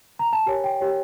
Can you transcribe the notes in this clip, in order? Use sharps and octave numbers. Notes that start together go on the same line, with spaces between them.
A#5
A5
G4 A#4 C#5 G#5
G5
G4 A#4 C#5